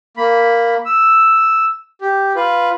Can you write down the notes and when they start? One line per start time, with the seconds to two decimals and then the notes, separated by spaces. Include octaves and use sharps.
0.17 A#3 B5
0.86 E6
2.01 G4
2.36 F4 B4